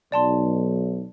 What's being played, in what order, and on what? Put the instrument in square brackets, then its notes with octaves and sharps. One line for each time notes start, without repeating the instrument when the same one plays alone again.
[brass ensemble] B1 [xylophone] D5 A5 C6